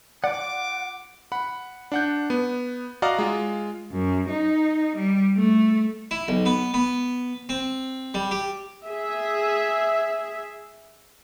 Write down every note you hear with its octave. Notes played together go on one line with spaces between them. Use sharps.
F4 D5 F#5 D6
F#5 B5
D4 F#5 G6
B3
F#4 D5 D#5 F5 A#5
G#3 F4
F#2
D#4
G3
A3
E4
B1
B3
B3
C4
G3
G4
G#4 E5